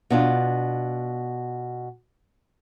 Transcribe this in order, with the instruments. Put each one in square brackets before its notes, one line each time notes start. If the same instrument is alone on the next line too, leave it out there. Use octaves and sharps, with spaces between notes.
[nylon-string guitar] B2 D4 F4